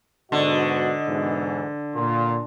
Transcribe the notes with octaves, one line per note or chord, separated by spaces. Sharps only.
G#2 B2 D3 F#4 D#5
G#2 B2 E3
A#2 C6